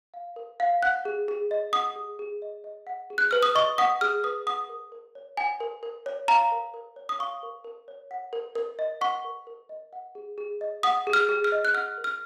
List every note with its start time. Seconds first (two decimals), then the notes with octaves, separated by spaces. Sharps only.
0.14 F5
0.36 A#4
0.60 F5
0.83 F#5 F#6
1.05 G#4
1.28 G#4
1.51 D#5
1.73 F#5 D#6
1.96 G#4
2.19 G#4
2.42 D#5
2.64 D#5
2.87 F#5
3.10 G#4
3.18 F#6
3.31 B4 F6
3.43 D#6
3.55 D#5 C#6
3.78 F#5 D#6
4.01 G#4 F6
4.24 B4 D#6
4.47 F#5 D#6
4.69 A#4
4.92 A#4
5.15 C#5
5.37 F#5 G#5
5.60 A#4
5.83 A#4
6.06 C#5
6.28 F5 A#5
6.52 A#4
6.74 A#4
6.96 C#5
7.09 D#6
7.19 F5 C#6
7.43 A#4
7.64 A#4
7.88 C#5
8.11 F#5
8.33 A#4
8.55 A#4
8.79 D#5
9.01 F#5 C#6
9.24 A#4
9.47 A#4
9.69 D#5
9.93 F#5
10.15 G#4
10.38 G#4
10.61 D#5
10.83 F#5 D#6
11.07 G#4
11.13 F6
11.29 G#4
11.44 F6
11.52 D#5
11.65 F#6
11.74 F#5 F6
11.98 A#4
12.04 F6